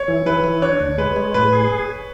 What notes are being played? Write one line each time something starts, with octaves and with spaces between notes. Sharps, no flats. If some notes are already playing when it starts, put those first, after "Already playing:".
Already playing: C#5
E3
E3 B4
E3
D4 C#5
D2
G#3 B4
G#3
A2 B4
G#4